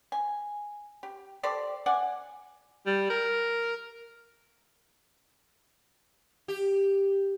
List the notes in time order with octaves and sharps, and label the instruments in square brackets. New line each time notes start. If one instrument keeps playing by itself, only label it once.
[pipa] G#5
G4
G4 A4 C5 D5
D5 F#5 G#5
[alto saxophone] G3
A#4
[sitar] G4